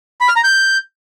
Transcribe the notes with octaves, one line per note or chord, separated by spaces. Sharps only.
B5
F6
A#5
G6